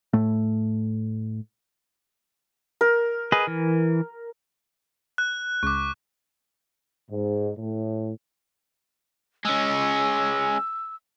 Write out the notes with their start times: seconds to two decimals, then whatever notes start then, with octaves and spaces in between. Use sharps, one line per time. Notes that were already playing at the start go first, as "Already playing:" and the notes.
0.13 A2 A3
2.81 A#4
3.32 G#4 B4 D#5
3.47 E3
5.18 F#6
5.63 C#2 C#6 D6
7.10 G#2
7.57 A2
9.45 G#3 C#4 E6